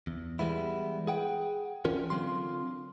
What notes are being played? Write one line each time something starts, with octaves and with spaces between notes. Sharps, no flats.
E2
E3 G3 G#3 B3 E4
G#4 F#5 G5
E3 C#4 D4 F4 A#4
D3 F#3 C4 F4 C6